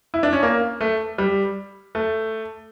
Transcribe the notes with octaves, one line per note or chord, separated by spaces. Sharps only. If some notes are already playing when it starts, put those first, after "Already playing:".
E4
D4
C#4
A#3
A3
G3
A3